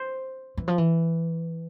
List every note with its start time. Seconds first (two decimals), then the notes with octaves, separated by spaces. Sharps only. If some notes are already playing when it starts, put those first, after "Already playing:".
Already playing: C5
0.57 E3
0.68 F3
0.78 E3